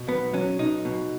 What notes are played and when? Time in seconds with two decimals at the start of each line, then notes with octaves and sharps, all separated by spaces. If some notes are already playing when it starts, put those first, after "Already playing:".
Already playing: B2
0.08 B1 B3
0.33 F#3 C#4
0.59 B1 D#4
0.85 B2